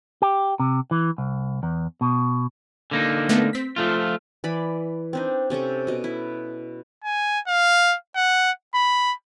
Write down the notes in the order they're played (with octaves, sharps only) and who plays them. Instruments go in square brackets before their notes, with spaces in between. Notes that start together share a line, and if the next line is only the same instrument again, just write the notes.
[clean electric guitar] G4
C3
E3
C2
E2
B2
D3 A#3 D#4
[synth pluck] A3 B3
C4 B6
[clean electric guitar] F3 A3 F4
[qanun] E3 D5 B5
C4 D4 D#4
C3 C#4 A4 C#6
B2 D#5
E4
[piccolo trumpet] G#5
F5
F#5
B5